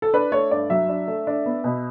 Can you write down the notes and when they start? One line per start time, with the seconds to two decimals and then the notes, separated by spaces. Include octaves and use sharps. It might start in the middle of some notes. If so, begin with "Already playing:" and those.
0.02 A4
0.14 D4 B4
0.32 A3 C#5
0.51 G2 D5
0.70 F#3 E5
0.89 D4
1.08 A3
1.27 D4
1.46 B3
1.64 B2